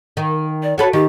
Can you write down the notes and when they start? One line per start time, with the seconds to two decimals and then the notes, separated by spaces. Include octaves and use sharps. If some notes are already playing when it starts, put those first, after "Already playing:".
0.17 D#3
0.63 D5
0.78 F#4 A4 B4 C#5
0.93 D#3 G4